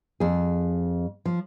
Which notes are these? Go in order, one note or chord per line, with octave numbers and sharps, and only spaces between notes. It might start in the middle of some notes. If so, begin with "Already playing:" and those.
F2 G#4
F3